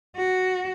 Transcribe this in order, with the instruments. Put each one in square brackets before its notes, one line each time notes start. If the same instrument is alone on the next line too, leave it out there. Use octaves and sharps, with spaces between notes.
[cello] F#4